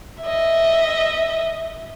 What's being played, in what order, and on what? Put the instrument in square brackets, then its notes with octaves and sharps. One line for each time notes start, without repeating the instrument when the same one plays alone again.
[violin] D#5 E5